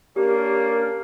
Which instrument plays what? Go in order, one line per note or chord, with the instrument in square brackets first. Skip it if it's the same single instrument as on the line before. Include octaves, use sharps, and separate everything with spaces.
[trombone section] A#3 C#4 D4 [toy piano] G4 [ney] A#4